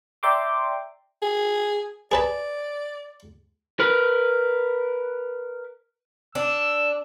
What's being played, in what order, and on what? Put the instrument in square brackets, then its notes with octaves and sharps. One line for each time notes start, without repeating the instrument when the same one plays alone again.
[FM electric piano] D5 E5 G5 A#5 C6 D6
[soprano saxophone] G#4
[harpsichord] G#4 B4 A5 [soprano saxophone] D5
[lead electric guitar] A#4 B4
[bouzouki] D4 [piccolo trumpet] E6